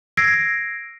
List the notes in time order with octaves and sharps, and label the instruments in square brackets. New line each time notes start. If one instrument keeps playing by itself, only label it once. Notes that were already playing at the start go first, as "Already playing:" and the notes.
[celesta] E6 G#6 A#6 C7 D7